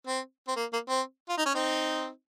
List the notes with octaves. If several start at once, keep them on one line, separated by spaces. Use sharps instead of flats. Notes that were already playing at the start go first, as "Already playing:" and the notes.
C4
C4
A#3
A#3
C4
F4
D#4
C#4
C4 D#4